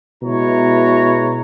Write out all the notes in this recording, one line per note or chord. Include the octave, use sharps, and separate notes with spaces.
B2 G#3 E4 B4 C#5 A#5